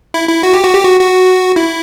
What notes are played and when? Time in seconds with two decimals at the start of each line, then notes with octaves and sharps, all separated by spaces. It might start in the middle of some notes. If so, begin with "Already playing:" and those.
0.14 E4
0.29 E4
0.43 F#4
0.53 G4
0.64 F#4
0.74 G4
0.84 F#4
1.00 F#4
1.56 E4